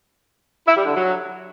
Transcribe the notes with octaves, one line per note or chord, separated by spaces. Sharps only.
E4
G3
D3
F#3